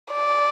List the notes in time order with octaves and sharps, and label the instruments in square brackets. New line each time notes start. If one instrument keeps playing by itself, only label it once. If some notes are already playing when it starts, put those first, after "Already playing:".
[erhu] D5